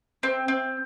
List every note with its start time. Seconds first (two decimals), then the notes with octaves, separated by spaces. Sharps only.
0.23 C4
0.48 C4